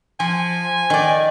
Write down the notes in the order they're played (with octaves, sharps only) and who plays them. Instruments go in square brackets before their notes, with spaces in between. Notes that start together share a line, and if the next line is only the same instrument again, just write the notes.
[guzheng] F3 [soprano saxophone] G#5
[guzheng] D#3 D5